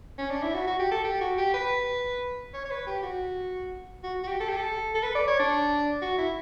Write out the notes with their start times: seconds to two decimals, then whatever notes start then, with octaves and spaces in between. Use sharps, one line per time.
0.18 C#4
0.30 D4
0.43 E4
0.54 F#4
0.67 F#4
0.79 G4
0.91 A4
1.04 G4
1.21 F#4
1.38 G4
1.54 B4
2.54 C#5
2.65 C#5
2.71 B4
2.87 G4
3.03 F#4
4.03 F#4
4.24 F#4
4.28 G4
4.40 A4
4.49 G4
4.57 A4
4.94 A4
5.03 B4
5.15 D5
5.27 C#5
5.39 D4
6.02 F#4
6.18 E4